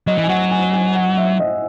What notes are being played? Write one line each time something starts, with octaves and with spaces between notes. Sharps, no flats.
F#3 D#5
E3
G#5
F#3 F#5
G#5
G#5
F#5
E5
D#5